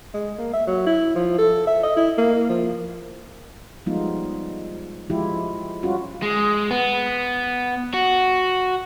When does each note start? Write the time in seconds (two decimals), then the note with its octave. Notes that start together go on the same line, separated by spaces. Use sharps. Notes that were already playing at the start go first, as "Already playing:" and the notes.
0.14 G#3
0.38 A#3
0.53 E5
0.67 F#3
0.86 E4
1.15 F3
1.38 A4
1.67 E5
1.83 D#5
1.96 E4
2.18 A#3
2.49 F3
3.86 F3 G3 G#3 B3 D#4 F4
5.10 F3 G#3 E4 F4 G4
5.83 G3 C#4 F4 F#4
6.22 G#3
6.71 B3
7.94 F#4